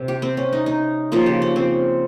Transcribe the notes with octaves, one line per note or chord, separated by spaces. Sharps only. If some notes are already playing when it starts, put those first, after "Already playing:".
Already playing: C3
G4
C4
C#4
D#4
D#4
C#3 F3 A#3 F4
G4
C#4
C4